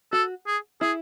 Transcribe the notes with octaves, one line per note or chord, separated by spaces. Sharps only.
F#4 A4
G#4
E4 G#4